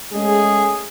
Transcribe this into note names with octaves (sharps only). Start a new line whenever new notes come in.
G#3 A3 C#4 G#4